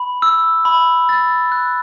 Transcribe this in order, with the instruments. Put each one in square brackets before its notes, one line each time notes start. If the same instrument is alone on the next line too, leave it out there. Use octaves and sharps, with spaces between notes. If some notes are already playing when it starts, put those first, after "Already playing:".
Already playing: [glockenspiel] B5
E6
B5
A6
F#6